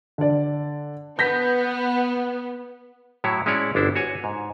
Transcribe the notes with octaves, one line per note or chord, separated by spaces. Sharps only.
D3 D5
B3 G6 A#6 B6
A2 F#3 E4 C#5
G#3 C#4 E4 C#5 D5
G1 D4 E4 C5
F#4 C#5 G#5
G#2